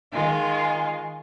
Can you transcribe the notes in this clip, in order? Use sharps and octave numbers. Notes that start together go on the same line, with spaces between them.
D#3 G#3 F4